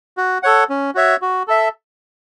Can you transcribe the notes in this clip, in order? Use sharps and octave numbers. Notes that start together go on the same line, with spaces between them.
F#4
A4 C#5 F#5
C#4
F#4 C#5 E5
F#4
A4 E5